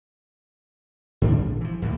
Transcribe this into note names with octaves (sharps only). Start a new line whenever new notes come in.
G#2 D3 G3 D4
A#1
E3 F3
D#2 A2 D3 A#3